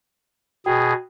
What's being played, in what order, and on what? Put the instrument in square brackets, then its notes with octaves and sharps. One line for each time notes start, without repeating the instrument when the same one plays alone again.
[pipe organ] B2 G#4 [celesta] F#4 G5